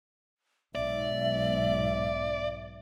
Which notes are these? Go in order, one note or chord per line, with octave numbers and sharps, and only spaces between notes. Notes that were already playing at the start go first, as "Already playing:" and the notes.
B1 G#2 B2 D5 E5